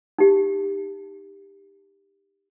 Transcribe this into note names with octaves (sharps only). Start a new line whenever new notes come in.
D#4 G4